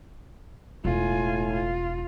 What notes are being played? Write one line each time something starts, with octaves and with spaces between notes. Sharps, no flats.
E1 A2 F4 G#5
F4